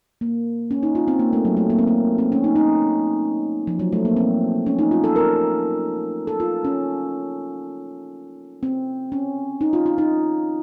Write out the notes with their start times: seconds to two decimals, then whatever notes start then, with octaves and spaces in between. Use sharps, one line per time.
0.21 A#3
0.71 C#4
0.83 D#4
0.95 F4
1.08 C4
1.19 A#3
1.33 A3
1.45 F#3
1.57 A3
1.70 A#3
1.79 C4
1.87 A#3
2.18 C4
2.32 C#4
2.44 D#4
2.56 D#4
3.67 F3
3.79 F#3
3.92 A3
4.05 A#3
4.17 C4
4.66 C#4
4.79 D#4
4.91 F4
5.04 A4
5.16 A#4
6.27 A4
6.40 F4
6.65 C#4
8.63 C4
9.12 C#4
9.61 D#4
9.73 F4
9.86 F4
9.98 D#4